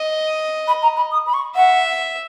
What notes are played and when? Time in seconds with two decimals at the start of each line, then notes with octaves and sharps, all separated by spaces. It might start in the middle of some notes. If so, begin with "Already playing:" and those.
Already playing: D#5
0.68 B5
0.82 A#5
0.97 B5
1.11 D#6
1.26 B5
1.34 C#6
1.55 E5 F#5